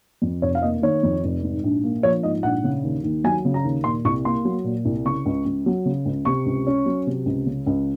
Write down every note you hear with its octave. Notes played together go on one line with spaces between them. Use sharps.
F2
F1 C#5
F5
A#3 D#5
D#3 C#5
F2
F1
G#2
A#1
A#3
F3 C#5
G#2 D#5
A#1 F#5
C#3
D#2
D#2
F#3 G#5
C#3
A#5
D#2
A#2 C6
C2 C#6
A#3 C6
F#3
A#2
C2
C#3 C#6
C#2
C#2
F#3
C#3
C#2
C3 C#6
C#2
C#4
F#3
C3
C#2
C#3
C#2